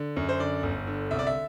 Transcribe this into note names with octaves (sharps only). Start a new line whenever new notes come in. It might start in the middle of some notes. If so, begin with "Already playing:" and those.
Already playing: D3
F#2
C5
D3 D5
G1
D3
C2 E5
D5
E5